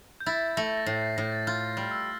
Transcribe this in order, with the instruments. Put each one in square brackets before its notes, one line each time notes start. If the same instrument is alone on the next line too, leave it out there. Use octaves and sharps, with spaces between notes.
[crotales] G6
[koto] E4 [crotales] A6
[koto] A3 [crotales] A#6
[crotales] A#6
[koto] A2 [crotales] C7
[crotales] C7
[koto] A2 [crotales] A#6
[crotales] A6
[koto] F4 [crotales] G6
[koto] G3 [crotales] F6
[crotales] E6